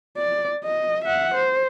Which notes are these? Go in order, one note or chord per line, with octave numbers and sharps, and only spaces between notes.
D5
D#5
E5 F#5
C5